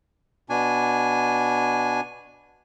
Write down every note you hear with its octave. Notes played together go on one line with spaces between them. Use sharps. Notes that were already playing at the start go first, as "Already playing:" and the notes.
B2 D4 G#5